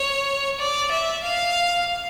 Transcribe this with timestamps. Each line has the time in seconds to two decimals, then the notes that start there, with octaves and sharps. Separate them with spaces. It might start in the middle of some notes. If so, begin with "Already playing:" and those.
Already playing: C#5
0.59 D5
0.91 E5
1.23 F5